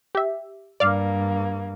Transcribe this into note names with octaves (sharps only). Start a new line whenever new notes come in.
G4 E5
G2 A#3 D5 F5